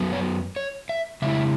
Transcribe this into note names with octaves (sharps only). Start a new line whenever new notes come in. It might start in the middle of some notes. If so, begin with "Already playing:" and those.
Already playing: F#2 F#3 B3
C#5
C#5
E5
C#3 G#3 E4 E5